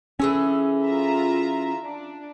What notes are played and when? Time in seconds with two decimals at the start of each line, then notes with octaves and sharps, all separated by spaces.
0.20 E3 C#4 G#4 A4
0.86 F4 E5 A#5
1.82 D4